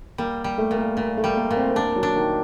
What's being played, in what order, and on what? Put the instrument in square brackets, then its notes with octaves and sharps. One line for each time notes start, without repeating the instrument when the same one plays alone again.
[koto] G3 [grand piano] A#3
[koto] G3
[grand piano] A3
[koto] A#2
[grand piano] A#3
[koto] A#2 [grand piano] A#3
[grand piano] A3
[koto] G3
[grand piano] A#3
[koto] A#2
[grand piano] C4
C4
[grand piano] A#3 [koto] D4
[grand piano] F#3
[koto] D4
[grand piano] D#3